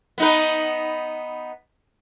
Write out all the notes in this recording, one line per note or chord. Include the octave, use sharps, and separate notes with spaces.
B3 D#4 B4